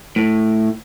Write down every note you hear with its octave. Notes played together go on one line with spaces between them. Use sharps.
A2